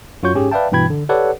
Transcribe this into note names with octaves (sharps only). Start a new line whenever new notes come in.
F#2 F4 F#4 C#5 C#6 G6
G#2 C#4 G4 G#4
B4 D5 E5 F5 G5 A5
G2 B2 E3 G5 B5 G#6
D3
G4 A4 B4 C#5 D5 F#5